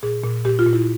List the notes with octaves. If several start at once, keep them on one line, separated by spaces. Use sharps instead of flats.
A#2 G#4
A#2
A#2 G4
F4
A#2
E4